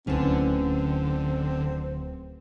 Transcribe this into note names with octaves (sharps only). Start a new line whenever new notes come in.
D1 D3 C4 C#4 B4 A5